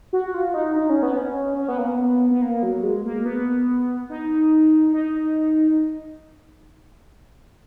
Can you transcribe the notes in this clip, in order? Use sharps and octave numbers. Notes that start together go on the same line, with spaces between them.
F#4
F4
D#4
D#4
C#4
B3
C#4
C#4
B3
A#3
B3
B3
A#3
F#3
G#3
A#3
B3
D#4
D#4